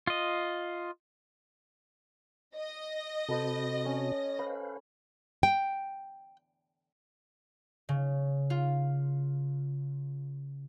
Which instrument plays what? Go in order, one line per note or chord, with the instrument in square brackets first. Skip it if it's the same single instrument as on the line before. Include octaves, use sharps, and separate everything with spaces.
[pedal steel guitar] F4 D#5
[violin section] D#5 A#6
[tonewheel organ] C3 C4 F#4 [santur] A4 B4 C5
[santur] C#4 C#5
[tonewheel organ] B4 C5 F5 [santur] B5
[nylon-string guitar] G5
[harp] C#3
F4